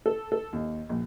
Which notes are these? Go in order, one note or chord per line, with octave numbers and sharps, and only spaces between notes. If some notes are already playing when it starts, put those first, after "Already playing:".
A4
A4
D#2
A#1